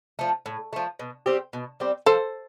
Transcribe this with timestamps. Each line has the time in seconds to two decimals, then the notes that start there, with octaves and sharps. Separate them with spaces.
0.19 F3 A3
0.46 A2
0.73 F3 A3
0.99 B2
1.26 G3 C4 G4
1.53 B2
1.80 G3 C4 G4
2.06 F3 A4 C5